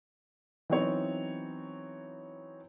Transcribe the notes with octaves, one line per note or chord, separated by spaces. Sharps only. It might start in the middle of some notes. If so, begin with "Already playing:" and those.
E3 F#3 B3 C4 D#4 C#5